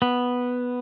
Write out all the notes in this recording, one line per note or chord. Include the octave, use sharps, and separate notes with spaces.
B3